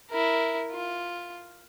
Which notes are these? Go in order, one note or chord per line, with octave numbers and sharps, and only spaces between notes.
E4 A#4
F4